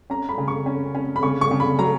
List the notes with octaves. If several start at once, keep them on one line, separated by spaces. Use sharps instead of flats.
C#4 A#5
B5
C#3
C#6
C#4
C#4
B5
C#3 C#6
C#6
C#3
B5
F#3 A#5